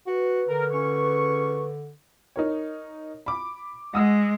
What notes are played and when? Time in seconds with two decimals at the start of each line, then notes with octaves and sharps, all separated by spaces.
0.07 F#4 B4
0.49 D3 A#4
0.72 C#2 C#4 C#6
2.36 D#4 A#4 C#5
3.26 B5 D6
3.94 G#3 F#5 D#6 E6